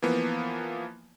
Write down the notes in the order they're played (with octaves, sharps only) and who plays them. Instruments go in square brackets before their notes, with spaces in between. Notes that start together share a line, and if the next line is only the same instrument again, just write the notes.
[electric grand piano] E3 F3 A#3 B3